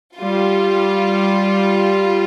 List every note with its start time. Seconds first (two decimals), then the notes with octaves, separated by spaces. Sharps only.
0.17 G3 F4